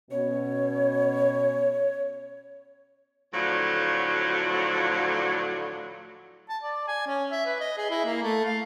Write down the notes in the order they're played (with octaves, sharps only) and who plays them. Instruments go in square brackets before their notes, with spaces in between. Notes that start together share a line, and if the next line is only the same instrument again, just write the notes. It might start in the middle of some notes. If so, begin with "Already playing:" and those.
[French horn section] B2 C#4 [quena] C#5
[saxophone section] A2 D3 F3 F#3
[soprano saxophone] A5
D5
G#5
C#4
E5
B4
D#5
G#4
E4
A#3
A3
F5